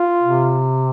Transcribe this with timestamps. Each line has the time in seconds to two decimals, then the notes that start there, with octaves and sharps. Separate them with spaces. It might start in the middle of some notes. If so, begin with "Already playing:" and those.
Already playing: F4
0.23 C3